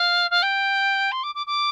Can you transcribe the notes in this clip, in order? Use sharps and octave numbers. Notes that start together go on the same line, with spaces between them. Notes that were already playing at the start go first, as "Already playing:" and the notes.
Already playing: F5
F5
G5
C6
D6
D6
D6